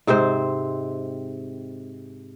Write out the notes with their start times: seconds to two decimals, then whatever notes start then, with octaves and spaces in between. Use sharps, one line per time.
0.07 G#2 C3 C4 C5